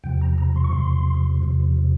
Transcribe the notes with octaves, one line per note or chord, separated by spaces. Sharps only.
E2 C3 F3 G5
A#5
A#5
C6
C#6
E2 C3 F3 C6
E2 C3 F3